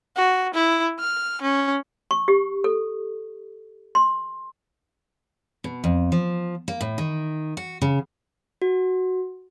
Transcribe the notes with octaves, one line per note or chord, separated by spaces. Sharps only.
F#4
E4
F6
C#4
C#6
G4
A4
C6
B2
F2
F3
A#3
A2
D#3
F#4
C#3
F#4